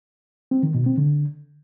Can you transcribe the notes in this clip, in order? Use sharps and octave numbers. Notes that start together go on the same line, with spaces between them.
C4
D#3
B2
C4
D3